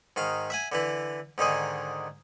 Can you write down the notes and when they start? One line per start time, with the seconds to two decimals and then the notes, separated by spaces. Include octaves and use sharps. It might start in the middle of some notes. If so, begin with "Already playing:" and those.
0.16 G#2 D#3 F5
0.50 E5 F#5 G#5
0.72 D3 E3 E4
1.38 G#2 D3 D#3 G#4